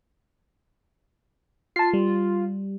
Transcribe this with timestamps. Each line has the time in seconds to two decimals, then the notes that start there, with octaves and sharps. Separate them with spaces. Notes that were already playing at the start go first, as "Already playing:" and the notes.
1.76 F4 A5 C7
1.93 G3